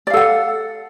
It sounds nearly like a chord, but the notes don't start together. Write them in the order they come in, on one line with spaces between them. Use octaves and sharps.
D5 F5 A4 F#5